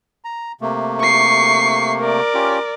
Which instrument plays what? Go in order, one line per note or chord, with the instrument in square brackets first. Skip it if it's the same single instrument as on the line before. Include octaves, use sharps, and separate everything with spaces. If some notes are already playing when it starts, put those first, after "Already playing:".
[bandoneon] A#5
C3 A3 A#3
[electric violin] C#6 C7
A#4 D5
[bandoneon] C#4 F4 G4